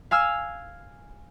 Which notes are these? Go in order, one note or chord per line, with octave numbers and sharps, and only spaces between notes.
F5 G#5 E6 F6